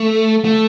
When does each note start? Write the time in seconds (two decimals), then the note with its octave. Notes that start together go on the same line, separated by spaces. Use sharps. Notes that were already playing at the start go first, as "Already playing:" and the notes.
Already playing: A3
0.44 A3